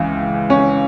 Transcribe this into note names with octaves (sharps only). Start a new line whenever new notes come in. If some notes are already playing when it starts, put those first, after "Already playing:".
Already playing: C#2 C#3 E3
C#4